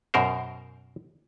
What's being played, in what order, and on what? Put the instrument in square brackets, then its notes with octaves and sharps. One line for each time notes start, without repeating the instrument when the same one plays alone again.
[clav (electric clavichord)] F#2 B2 A#4 C5